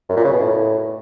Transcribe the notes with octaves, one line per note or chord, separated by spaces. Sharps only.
F#2
A#2
C#3
B2
A2